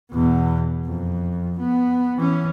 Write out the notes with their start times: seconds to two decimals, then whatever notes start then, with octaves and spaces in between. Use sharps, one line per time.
0.12 E2 B2
0.86 F2
1.59 B3
2.17 E3 C#4